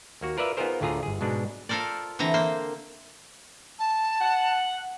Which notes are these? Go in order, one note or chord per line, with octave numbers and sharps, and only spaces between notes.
D#2 A#3 F#4
F4 A#4 B4 D5 E5 F5
B3 D#4 F4 G#4 A#4 C5
D2 A2 D3 F4 G#4 A#5
G1 G#4
G#2 B2 G#3 D4
F4 A4 A#4 C5 D5
D3 E3 C4 A#5
A#3 C5
A5
F#5